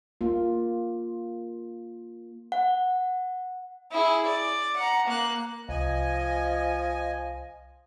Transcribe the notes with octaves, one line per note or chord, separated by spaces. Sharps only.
A#3 F4
F#5
E4 G#4
D5
F#5 A#5
A#3 F#6
C2 F3 D#5 G#5